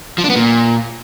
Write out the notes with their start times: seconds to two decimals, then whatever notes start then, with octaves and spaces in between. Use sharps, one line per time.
0.18 F3
0.24 D4
0.30 B3
0.36 A#2